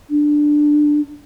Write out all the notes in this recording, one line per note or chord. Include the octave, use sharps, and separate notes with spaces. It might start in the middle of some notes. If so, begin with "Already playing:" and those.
D4